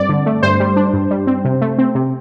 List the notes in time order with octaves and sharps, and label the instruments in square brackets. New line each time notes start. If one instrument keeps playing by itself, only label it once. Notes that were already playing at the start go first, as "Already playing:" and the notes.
Already playing: [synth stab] G2 C4 D5
D3
A3
G2 C5
G3
D4
G2
G3
C4
C3
A3
C4
C3